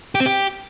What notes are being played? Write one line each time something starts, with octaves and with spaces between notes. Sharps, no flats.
G4
C4
G4